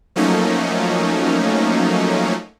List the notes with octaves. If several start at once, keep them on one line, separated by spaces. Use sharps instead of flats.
F3 F#3 A3 A#3 C#4 D#4